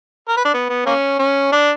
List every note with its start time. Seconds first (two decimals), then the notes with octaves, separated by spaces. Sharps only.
0.29 A#4
0.37 B4
0.45 D4
0.54 B3
0.69 B3
0.86 A#3 C#4
1.19 C#4
1.52 D4